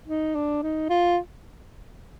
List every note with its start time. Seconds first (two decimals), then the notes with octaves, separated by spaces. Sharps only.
0.08 D#4
0.35 D4
0.62 D#4
0.89 F4